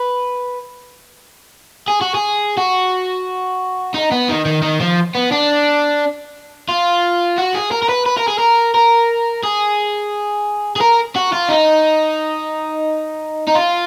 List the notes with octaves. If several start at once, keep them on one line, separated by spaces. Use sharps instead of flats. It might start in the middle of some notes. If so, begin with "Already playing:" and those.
Already playing: B4
G#4
F#4
G#4
F#4
D#4
B3
D#3
D#3
D#3
F3
B3
D4
F4
F#4
G#4
A#4
A#4
B4
B4
A#4
G#4
A#4
A#4
G#4
G#4
A#4
F#4
F4
D#4
D#4
F4